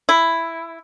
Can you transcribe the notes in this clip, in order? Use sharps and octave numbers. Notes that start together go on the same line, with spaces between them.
E4